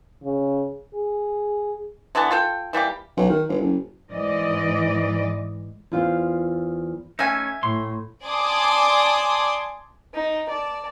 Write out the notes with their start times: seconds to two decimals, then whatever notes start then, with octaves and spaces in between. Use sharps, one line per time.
0.24 C#3
0.93 G#4
2.15 D3 E3 B3 A5
2.31 F4 A4 G5
2.73 E3 G3 A#3 G4
3.17 B1
3.29 D#3
3.49 G1
3.60 F#1
4.11 G#2 E3 D5 D#5
5.92 E2 F4 C5
7.19 A3 C#4 D#4 E5 G#5
7.63 A2 C6
8.25 D5 G#5 A5 C6 D6 D#6
10.14 D#4
10.49 D5 A5